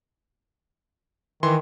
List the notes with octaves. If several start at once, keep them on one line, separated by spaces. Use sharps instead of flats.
D#3 E3 C6